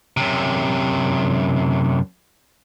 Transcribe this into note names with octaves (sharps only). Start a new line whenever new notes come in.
F#2 C3